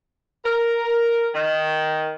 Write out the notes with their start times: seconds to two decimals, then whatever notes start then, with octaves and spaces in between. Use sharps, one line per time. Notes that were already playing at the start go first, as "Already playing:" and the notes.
0.45 A#4
1.34 D#3